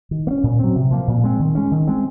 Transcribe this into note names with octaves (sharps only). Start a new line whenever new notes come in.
D#3
A#3
C#4
A#2
F#3 C4
C3
F3 A#3
A#2
G#3 C4
D#3
G#3 C#4
D#3
G#3 C4